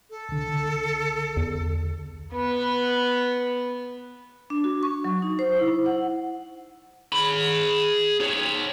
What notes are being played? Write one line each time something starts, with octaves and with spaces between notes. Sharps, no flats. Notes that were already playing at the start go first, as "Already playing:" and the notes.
A4
C2 D3
E2
B3 B4
D4
F#4
C#6
F#3
D#4
C5
E4
F#5
G#4 B5
D#4 C#5